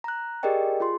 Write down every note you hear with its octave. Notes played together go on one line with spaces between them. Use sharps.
A#5 F#6
G4 G#4 A#4 D5 D#5 G5
F4 G#4 C6